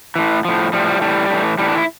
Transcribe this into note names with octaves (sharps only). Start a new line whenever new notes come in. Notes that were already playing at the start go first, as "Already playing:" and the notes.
A2 E3
A2 F3
A2 F3 G3
G3
A2 E3 G3
A2 E3
A2 E3 G3
D4
E4